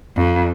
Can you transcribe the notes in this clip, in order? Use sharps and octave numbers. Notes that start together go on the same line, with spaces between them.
F2